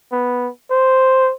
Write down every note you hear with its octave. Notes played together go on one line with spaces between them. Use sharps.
B3
C5